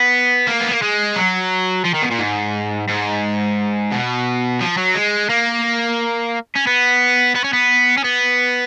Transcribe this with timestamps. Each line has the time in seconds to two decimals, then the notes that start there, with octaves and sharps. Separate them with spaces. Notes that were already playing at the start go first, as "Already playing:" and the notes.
Already playing: B3
0.47 A#3
0.60 B3
0.71 A#3
0.82 G#3
1.16 F#3
1.85 F3
1.94 D#3
2.02 B2
2.11 A#2
2.19 G#2
2.88 G#2
3.92 B2
4.61 F3
4.77 F#3
4.95 G#3
5.29 A#3
6.55 C#4
6.67 B3
7.36 B3
7.44 C#4
7.53 B3
7.98 C#4
8.04 B3